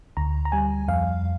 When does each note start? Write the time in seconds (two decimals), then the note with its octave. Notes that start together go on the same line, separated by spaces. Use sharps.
0.17 D2 A#5
0.45 A#5
0.52 G3 G#5
0.88 F2 F5